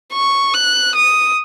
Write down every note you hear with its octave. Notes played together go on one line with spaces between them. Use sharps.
C#6
F#6
D#6